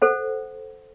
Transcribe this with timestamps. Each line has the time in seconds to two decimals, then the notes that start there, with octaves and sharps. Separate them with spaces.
0.02 A4 C5 F#5